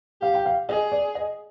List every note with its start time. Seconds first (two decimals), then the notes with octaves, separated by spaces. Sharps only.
0.22 G4 F5
0.34 G5
0.46 F5
0.69 G#4 D#5
0.92 D5
1.15 D#5